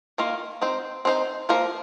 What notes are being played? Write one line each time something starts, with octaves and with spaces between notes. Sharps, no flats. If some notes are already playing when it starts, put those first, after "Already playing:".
D#3 A#3 F4 A#4
C4 D#4 C5
C4 D#4 C5
F3 A#3 F4 A#4